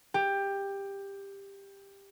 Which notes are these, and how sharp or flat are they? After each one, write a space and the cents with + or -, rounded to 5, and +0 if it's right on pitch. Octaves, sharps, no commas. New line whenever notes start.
G4 +15